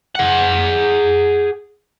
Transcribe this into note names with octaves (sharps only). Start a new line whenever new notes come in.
G#4 F#5